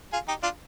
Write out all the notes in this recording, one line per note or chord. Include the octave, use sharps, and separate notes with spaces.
F4 G#4
D#4 G4
D4 F4